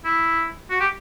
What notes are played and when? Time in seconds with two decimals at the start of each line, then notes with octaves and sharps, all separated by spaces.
0.05 E4
0.71 F#4
0.80 G4